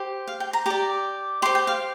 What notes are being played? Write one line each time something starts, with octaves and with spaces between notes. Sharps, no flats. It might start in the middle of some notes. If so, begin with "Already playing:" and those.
Already playing: G4 C5
F5
G5
A#5
G4 D5 A#5
G4 C5 C6
G5
F5